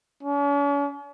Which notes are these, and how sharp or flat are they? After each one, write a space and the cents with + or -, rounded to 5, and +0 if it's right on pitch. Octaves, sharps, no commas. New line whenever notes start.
C#4 +45